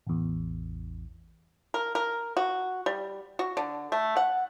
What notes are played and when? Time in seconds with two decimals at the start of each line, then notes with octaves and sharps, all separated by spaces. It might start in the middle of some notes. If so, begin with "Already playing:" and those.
0.07 A1 E2
1.74 A#4
1.95 A#4
2.37 F#4
2.86 G3
3.39 F#4
3.57 D3
3.92 A3
4.17 F#5